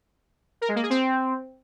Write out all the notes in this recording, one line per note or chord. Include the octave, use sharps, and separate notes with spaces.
A#4
G#3
A#3
G#4
C4